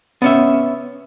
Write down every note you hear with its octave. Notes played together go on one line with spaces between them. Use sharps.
B3 C#4 E5